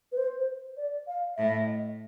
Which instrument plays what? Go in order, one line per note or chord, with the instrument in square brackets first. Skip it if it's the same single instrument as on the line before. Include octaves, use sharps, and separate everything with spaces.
[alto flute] B4
C5
D5
F5
[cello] A2 [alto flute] E5
[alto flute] D#5